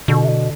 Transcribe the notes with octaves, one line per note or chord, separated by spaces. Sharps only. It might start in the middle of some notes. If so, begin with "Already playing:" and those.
B2 D3
C3
B2